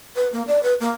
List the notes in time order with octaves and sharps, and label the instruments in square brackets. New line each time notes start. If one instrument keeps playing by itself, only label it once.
[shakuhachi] B4
A#3
D5
B4
A#3